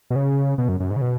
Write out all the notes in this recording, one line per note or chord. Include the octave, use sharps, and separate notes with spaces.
B2
C#3
B2
F#2
F#2
G#2
C#3
B2